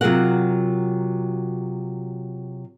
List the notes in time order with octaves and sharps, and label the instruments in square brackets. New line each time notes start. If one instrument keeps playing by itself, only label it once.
[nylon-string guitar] C3 F#3 F4 G#4 A#4 F#5